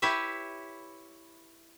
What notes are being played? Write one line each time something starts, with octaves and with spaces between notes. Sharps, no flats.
E4 G4 B4 C#5 E5